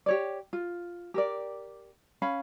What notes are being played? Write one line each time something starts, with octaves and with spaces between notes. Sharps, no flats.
G4 C#5 D5
F4
G4 A#4 D5
C#4 F5 B5